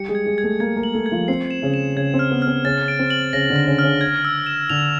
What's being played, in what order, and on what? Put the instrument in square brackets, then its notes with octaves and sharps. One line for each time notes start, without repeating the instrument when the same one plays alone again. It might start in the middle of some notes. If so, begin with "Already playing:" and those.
Already playing: [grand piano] G3 G4 [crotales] C#7
[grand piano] G#3 G#4
[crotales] G#6
[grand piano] G#3 G#4
[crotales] G#6
[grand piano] A3 A4
[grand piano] A#3 A#4 [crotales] G#6
[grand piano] A#3 A#4
[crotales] F#7
[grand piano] A3 A4
[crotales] G#6
[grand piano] F3 F4
[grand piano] C4 [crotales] C7
[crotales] E7
[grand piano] C#3 C#4
[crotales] E7
[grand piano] C#3 C#4 [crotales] G#6
[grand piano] C4
[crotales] F6
[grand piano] B3
[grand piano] C4 [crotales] F6
[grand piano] C#3 C#4 [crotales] A6
[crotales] D7
[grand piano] C4
[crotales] F#7
[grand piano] C#3 C#4 [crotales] A#6
[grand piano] D3 D4
[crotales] A#6
[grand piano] C#3 C#4
[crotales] F6
[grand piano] C#3 C#4
[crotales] G#6
E6
E7
[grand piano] D3 D4 [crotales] F7